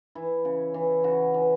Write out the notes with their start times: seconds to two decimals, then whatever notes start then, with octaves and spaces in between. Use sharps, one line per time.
0.15 E3 E4
0.45 C#3
0.74 E3
1.04 C#3 F#4
1.34 E3